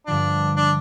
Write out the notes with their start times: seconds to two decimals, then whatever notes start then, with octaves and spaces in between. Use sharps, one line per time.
0.07 G2 D3 F3 D4
0.57 D4